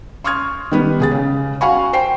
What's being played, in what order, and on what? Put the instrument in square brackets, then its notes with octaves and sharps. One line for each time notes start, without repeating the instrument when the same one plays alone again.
[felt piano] C6 C#6 D#6 F6 G#6
D#3 G3 B3 B4
C#2 G#4 A6
C#3
F#4 F5 F#5 G#5 B5 C#6
C5 G5 C7